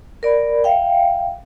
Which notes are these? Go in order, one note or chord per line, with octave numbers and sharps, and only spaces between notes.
A#4 D5 B5
E5 F5 G5